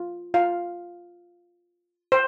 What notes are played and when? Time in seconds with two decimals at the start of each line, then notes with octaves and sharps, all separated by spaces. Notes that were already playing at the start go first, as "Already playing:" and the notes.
Already playing: F4
0.34 F4 F5
2.12 C5